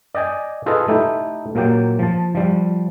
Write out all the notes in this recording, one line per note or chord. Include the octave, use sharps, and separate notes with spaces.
D5 D#5 G5 G#5
F4 G#4 A4 B4 D#5
A3 D#4 E4 G4
A#2 F#3 A#3 G4 G5
F3 A5
F3 G3